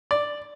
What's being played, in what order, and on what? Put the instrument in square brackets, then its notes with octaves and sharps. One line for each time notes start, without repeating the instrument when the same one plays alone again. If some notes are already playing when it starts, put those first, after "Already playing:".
[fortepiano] D5